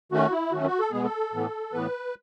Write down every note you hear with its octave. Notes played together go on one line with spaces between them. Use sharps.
D#3 A3 C#4 F#4
E4
D#3 F#3 A3 C#4 F#4
F#4
A4
B2 G#3 B3 G#4
A4
A2 E3 B3
A2 E3 B3 B4